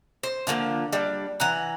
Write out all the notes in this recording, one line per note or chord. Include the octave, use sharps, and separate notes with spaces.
C5
D3 F3 G3 A#3
G3 D4
E3 F#5 A#5